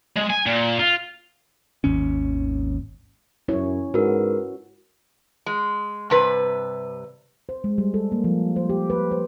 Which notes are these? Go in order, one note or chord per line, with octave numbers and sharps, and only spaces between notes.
G#3
G#5
A#2
F4
G#1 D#2 C#4
F#2 C#4 E4 C#5
G#2 F#4 A#4 B4
G#3
G2 C3 B4
C5
G#3
G3
A4
A#3
F3
C5
G4
B4
C5